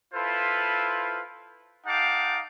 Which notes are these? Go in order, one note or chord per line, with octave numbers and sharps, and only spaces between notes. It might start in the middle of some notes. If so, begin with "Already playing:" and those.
E4 F4 A4 B4 C5 F5
D#4 G4 F5 F#5 A5 D6